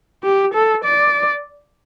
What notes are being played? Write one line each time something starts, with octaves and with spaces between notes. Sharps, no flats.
G4
A4
D5